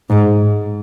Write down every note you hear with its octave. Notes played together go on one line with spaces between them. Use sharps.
G#2